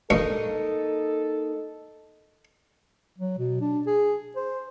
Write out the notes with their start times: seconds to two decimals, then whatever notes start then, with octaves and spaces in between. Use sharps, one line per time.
0.10 G2 A#3 D#4 A4 B4 D#5 C#6
3.18 F#3
3.38 B2
3.61 D4
3.86 G#4
4.36 C5